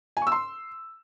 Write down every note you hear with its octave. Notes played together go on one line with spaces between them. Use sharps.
G#5
C#6
E6
C6